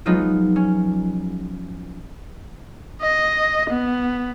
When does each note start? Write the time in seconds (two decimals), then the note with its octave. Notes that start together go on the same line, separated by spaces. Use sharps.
0.05 F3 F#3 G#3 B3 D#4 F4
0.56 C#4
3.02 D#5
3.70 B3